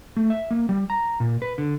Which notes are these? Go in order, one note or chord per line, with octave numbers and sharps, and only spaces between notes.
A3
E5
A#3
G3
A#5
A#2
B4
D3